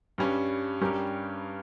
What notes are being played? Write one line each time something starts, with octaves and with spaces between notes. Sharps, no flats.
G2 G3 C#4
G2 G3 C#4 G4 A#4